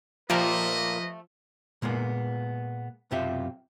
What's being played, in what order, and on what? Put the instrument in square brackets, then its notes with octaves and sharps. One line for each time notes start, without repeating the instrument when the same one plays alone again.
[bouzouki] A#2 A#3 [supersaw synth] F3 [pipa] A3 G4 A#4 [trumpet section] B4 D#5
[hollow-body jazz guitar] A#2 G#3 A#3 B3
B1 F#2 C3 F4 G4 E5